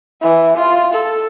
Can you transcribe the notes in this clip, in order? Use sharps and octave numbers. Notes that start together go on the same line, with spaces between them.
E3
F4
A4